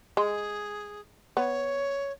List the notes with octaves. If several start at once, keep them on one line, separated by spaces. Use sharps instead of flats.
G#3 G#4
B3 C#5